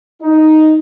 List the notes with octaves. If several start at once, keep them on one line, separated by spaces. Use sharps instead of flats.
D#4